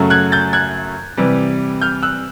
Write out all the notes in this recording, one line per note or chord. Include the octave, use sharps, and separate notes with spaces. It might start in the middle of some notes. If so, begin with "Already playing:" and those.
Already playing: F#2 C#3 F#3 A3
F#6 G#6
G6 A6
F#6 G#6
C3 E3 G3
F6 G6
E6 F#6